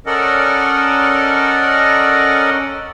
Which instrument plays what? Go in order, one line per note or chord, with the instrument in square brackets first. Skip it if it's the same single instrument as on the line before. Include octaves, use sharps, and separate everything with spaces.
[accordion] C#4 A4 A#4 D5 D#5 F#5